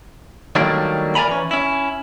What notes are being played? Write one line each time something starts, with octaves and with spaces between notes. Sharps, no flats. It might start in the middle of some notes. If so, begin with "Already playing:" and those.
D#3 F#3 G3 A3 A#3 D4
A#4 D5 E5 G#5 A#5 B5
E3 C#4
C#4 E4